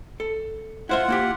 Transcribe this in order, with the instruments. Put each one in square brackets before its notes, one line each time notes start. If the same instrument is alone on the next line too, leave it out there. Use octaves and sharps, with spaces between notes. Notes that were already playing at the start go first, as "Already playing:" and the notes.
[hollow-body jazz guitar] A4
[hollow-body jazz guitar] E4 C5 E5 [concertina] F4 F#5
[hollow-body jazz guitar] A#3 E4 G4